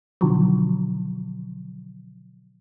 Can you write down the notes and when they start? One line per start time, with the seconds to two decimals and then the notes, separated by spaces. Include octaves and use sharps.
0.21 B2 D3 D#3 F3 F#3